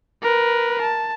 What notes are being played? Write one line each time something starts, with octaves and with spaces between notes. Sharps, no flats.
A#4 B4
A5